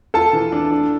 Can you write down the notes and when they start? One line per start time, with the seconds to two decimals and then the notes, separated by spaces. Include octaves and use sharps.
0.14 F4 A4 A5
0.33 E3
0.52 D4
0.71 D4